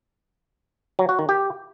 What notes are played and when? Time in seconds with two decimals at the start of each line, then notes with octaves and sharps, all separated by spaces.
0.99 F#3
1.09 F#4
1.19 D#3
1.29 G4